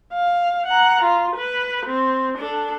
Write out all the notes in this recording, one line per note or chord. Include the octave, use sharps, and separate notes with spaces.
F5
F#5 A#5
F4
B4
C4
D4 A4